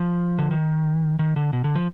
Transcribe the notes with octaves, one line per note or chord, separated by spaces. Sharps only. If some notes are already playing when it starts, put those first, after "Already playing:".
Already playing: F3
D3
D#3
D#3
D3
B2
D3
F3